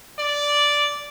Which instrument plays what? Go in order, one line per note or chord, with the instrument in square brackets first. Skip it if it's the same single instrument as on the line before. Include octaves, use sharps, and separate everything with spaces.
[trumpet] D5